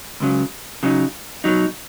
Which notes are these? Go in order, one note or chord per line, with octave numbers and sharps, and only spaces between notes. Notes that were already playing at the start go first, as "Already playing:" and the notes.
C#2 C#3 F#3
C#3 F#3 D#4
B2 F#3 D#4